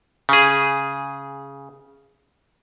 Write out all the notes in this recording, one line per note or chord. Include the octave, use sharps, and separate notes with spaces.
C#3 G#4